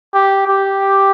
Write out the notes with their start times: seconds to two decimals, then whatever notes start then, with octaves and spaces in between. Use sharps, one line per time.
0.14 G4
0.47 G4